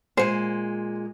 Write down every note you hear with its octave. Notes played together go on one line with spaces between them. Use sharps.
A#2 G#3 C5